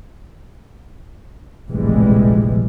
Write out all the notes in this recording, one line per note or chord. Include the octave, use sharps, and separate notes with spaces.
F1 A#1 A2 E3 G3 G#3